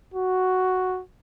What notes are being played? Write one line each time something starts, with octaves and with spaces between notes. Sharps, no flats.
F#4